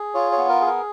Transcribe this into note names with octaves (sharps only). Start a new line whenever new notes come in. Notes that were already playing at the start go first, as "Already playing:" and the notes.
Already playing: G#4
F4 C#5
C#5
B3
A#4
G#4
A#4